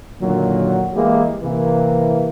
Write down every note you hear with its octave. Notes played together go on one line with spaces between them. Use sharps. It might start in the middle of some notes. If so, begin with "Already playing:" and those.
A#2 D3 D#3 F#3
E3 G#3 A#3 E4 G4 A#4
C3 E3 A#3